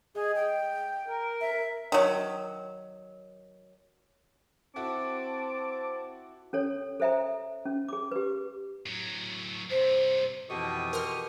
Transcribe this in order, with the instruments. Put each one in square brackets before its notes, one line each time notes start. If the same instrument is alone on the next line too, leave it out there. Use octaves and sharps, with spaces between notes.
[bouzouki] G#3 A3 D#4 [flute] G#4
[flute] G5
[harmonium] A#4
[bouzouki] C4 [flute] E5
[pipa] D#3 F#3
[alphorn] C4 [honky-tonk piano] E4 F#4 A4 [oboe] A5 [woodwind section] D6
[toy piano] C#4 A4 C#5
A4 C5 E5 G5 A#5
C#4
G#4 D6
G4 B4
[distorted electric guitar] A2 F#3
[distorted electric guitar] G2 C3 [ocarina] C5
[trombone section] F2 E3 A4 [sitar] B2 [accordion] G4 C#6 D#6
[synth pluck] A#4 C6 F6